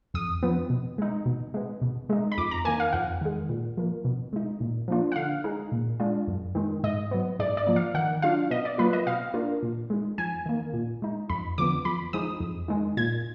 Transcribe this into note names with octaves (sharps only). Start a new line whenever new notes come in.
F2 D#6
F3 B3
B2
G#3 D#4
B2
G#3 B3
B2
G#3 D#4
B5
F2 D6
A#5
D#3 A#3 G#5
F5
F2 F#5
D#3 G#3
A#2
F3 A#3
B2
G#3 D#4
A#2
F3 A#3 D4 F4
F#5
D3 F5
G#3 D#4
A#2
G#3 D4 F4
F#2
D#3 G#3
G#2 D#5
F#3 B3
G#2 D5
D5
F3 A#3
F5
D#3 F#5
F#3 D4 F4 F5
B2 D#5
D5
F#3 A#3 F4 B4
D#5
B2 F5
A#3 D4 F4
A#2
G#3 D#4
F2 G#5
D#3 A#3
A#2
G#3 D#4
F2 B5
D3 F3 B3 D6
F2 B5
F3 G#3 D#4 D#6
F2
D#3 G#3
A#2 G#6